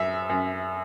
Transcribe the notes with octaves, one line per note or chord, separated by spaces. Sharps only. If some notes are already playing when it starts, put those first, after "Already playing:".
Already playing: F#2 E5
F#2